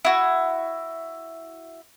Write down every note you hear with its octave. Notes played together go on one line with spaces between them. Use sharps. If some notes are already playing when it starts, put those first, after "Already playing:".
E4 F#4